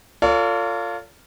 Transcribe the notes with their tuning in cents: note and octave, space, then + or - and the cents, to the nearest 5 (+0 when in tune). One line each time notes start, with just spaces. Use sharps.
F4 +0 A4 +40 C#5 +45